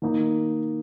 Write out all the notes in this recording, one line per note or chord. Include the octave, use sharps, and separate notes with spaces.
D#3 A#3 D#4